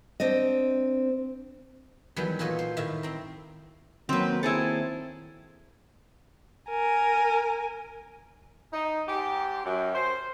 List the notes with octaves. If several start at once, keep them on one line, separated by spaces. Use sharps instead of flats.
C4 D4 D#5
E2 D#3 F#3 G3 B3
A#2 F4 F#4 A4 C#5 D#5
C5
A2 D#3 E5 A5
C4 A#5
D#3 F#3 A#3 C4 B4
C4 E4 G#4 A4
A#4 G#5
D#4
G#2 G4
F#2
C5